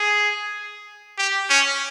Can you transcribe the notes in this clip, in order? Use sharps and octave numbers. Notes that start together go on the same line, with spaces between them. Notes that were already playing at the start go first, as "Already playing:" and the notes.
Already playing: G#4
G4
C#4